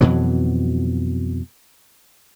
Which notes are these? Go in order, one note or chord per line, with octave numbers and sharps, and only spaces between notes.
F2 B2 E3 F#3